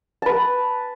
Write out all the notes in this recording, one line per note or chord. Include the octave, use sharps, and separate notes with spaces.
B4 A5